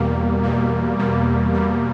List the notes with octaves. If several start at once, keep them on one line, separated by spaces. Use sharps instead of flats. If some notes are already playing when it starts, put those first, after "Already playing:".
Already playing: E2 B2 G3 A#3
E2 B2 G3 A#3
E2 B2 G3 A#3
E2 B2 G3 A#3